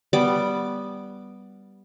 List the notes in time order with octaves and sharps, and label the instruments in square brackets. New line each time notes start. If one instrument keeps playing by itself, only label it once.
[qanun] G3 B3 D6